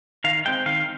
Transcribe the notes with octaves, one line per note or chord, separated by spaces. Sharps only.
D#3 F5
G#3 C4 G5
D#3 F5